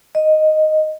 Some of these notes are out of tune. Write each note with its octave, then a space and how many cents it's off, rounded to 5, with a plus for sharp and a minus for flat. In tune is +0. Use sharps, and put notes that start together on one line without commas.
D#5 -5